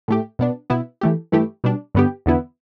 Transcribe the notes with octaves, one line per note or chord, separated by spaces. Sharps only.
A2 A3 G4
B2 B3 D4
B2 B3 E4
E3 A3 G4
G2 E3 A3 E4 G4
B2 G3 D4
G2 D3 B3 G4
E2 D3 B3 E4